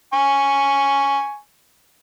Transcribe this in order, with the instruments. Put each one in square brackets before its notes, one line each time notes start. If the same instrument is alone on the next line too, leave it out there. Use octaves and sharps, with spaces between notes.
[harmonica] G#5 C#6